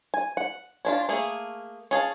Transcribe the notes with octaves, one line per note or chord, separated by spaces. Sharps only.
G#5
F#5
C#4 D4 F4
A3 A#3 G#4
C#4 G#4 F5 A5